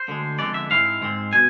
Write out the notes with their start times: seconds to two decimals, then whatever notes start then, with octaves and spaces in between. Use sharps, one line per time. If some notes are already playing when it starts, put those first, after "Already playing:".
Already playing: C5
0.08 D2 D3 G#3
0.38 F2 D3 G#3 B3 D5
0.54 E5
0.70 G#2 G#3 C4 E4 F5
1.02 G#2 G#3 C4
1.33 B2 G#5